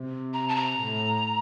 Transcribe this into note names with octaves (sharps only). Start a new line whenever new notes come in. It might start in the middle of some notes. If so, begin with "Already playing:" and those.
Already playing: C3
A#5
A5
A#5
A2